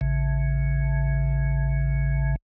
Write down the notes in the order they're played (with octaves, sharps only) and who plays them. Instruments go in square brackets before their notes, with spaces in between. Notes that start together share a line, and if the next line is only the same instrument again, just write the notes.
[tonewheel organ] A1 C#3